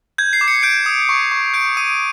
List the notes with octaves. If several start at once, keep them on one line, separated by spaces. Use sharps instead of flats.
G6 G#6
C7
D6
C#7
G6 D7
D#6
C#6
C#6
G6 D7
D#6 D#7